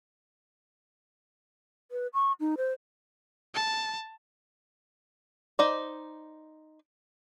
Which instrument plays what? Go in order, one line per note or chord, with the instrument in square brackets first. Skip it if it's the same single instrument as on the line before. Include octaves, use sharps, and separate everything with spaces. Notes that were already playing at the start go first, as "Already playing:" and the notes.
[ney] B4
C#6
D#4
C5
[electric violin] A5
[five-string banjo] D#4 C5 D5